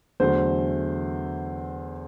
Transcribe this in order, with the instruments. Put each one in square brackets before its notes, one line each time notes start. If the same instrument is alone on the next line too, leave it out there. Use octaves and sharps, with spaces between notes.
[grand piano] E2 D3 F#3 A3 C5